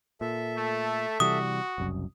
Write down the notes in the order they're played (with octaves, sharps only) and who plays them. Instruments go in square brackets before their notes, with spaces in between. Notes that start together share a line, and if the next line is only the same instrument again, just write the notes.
[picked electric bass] A#2 [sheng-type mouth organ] A4 E5
[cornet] A3
[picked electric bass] C3 E3 G3 [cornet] F#4 [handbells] D#6
[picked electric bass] F#1 C2 F#2